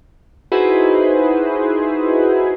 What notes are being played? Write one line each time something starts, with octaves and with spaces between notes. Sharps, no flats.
D#4 E4 F#4 G#4 B4 C5